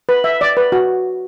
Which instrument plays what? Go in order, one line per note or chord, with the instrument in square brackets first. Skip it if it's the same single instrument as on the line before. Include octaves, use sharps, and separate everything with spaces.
[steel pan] B4
E5
D5
B4
F#4